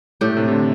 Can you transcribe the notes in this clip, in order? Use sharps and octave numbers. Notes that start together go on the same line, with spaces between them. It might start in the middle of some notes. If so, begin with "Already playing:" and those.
A2 A3 D4 G4
C3
C3
D3